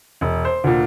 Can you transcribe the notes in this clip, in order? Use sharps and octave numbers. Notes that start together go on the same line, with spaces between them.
E1
C5
D2 A#2